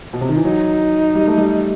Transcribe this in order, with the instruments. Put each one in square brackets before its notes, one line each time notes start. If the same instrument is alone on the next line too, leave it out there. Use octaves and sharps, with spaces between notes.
[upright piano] B2
C3
D#3
E3
[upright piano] F#3 [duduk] D#4
[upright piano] G3
A3
G3